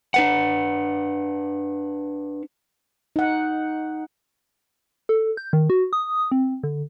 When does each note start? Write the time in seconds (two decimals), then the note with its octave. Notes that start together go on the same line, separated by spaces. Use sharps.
0.14 D4 B4 F#5
3.16 D#4 F#5
5.09 A4
5.37 G6
5.53 D#3
5.70 F#4
5.93 D#6
6.32 C4
6.63 D3